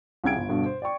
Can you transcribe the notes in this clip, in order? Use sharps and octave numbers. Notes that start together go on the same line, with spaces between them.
C2 C#3 G5 G#6 D7
G1
G2 B2 D3
C5
D5 G5 C#6